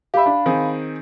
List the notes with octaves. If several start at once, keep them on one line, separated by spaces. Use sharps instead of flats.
G4 E5 F5 B5
D4
D#3 C4 G#4